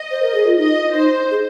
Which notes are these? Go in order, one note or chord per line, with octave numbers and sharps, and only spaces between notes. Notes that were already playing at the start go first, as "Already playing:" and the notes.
Already playing: D#5
C5
A#4
G#4
F4
D#4 D#5
D#4 C5
G#4